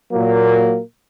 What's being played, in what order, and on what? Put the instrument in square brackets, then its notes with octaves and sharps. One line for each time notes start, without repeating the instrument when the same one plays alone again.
[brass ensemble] A#2 F#3 A#3